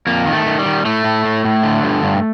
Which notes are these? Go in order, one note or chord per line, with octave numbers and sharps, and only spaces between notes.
F2 A#3
D#3
A3
D#3
G3
D#3
A2 A3
A2
A2
A2
D3
G2
G2